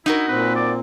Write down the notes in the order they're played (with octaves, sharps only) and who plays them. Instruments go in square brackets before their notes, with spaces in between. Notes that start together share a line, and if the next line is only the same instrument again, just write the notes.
[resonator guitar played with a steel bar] D#4 F#4 A#4 [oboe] E4
[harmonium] A#2 C4 [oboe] B4
[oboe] D5